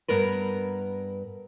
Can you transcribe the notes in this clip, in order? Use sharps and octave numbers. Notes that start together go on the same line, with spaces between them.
G2 B3 A#4 B4